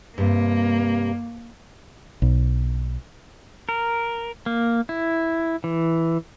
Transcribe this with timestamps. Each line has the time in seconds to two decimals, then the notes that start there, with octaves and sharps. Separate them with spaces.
0.18 G2 C3 A#3
2.22 B1
3.69 A#4
4.46 A#3
4.89 E4
5.64 E3